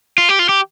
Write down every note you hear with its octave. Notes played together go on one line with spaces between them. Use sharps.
F4
G4
F4
G4